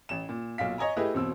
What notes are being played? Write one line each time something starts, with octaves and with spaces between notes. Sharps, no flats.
A1 E7
A#2
B1 A#2 F5 B6
C#5 D#5 G#5 A#5
A3 E4 G4 G#4 B4 D#5
E1 B2 C4 E6